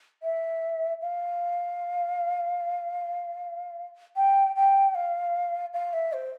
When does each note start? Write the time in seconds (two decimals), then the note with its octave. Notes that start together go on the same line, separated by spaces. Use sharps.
0.23 E5
1.01 F5
4.16 G5
4.56 G5
4.95 F5
5.74 F5
5.93 E5
6.13 C5